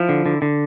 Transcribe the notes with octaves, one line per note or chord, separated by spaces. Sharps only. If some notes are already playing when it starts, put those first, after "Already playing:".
Already playing: F3 E4
D3
D3
D3